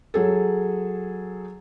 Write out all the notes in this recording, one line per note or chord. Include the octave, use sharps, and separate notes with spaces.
F#3 G#4 A4